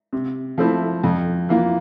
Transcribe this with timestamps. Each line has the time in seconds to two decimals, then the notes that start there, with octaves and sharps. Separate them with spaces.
0.13 C3
0.58 F3 A3 C4 E4
1.04 F2
1.49 E3 A#3 F4